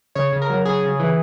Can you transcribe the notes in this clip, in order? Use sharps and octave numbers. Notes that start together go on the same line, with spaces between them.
C#3 C#5
C#3
A#4
F#3
C#3 G#4
C#3
E3